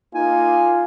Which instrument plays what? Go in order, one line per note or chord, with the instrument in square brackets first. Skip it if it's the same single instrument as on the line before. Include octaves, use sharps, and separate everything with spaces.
[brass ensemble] A#3 D#4 [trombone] F4 [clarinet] G#5